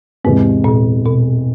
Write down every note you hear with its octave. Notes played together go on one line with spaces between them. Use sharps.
E2 G#2 C3 E3 G#3
A#2
B2